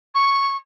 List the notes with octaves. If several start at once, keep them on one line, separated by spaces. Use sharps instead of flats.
C#6